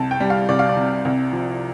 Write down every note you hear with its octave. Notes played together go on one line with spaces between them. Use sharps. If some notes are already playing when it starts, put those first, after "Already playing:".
Already playing: C2 A5
G5
G3
F5
C2 D5
F5
D5
C3
C2
F3